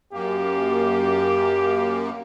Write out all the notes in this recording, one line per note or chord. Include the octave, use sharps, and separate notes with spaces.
F#2 A#3 G4